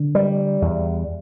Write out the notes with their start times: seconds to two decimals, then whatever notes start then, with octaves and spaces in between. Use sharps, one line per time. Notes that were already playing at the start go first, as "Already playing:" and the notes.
Already playing: D3
0.15 G3
0.62 E2